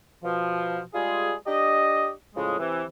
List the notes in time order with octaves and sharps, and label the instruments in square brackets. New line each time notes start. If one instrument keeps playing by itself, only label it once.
[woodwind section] B2 F3
G3 G#3 F4 G#4
D4 G4 D#5
A2 C#3 F3 G#3
C3 E3